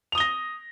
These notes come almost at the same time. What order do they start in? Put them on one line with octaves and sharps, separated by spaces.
F7 D#6 G7 A#6